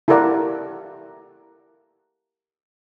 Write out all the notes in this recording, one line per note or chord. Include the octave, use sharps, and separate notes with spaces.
E4 G4 A4 A#4 D5 F#5